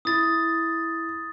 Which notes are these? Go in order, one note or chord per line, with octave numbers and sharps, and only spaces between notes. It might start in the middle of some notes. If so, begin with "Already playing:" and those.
E4 D#6 A6